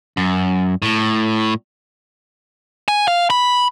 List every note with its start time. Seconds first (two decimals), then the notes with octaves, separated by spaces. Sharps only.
0.17 F#2
0.82 A2
2.88 G#5
3.08 F5
3.30 B5